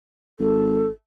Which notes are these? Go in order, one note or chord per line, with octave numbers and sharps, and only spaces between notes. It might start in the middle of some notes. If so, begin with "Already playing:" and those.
G#1 A4